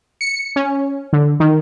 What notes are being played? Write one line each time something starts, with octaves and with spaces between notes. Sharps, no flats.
C#7
C#4
D3
D#3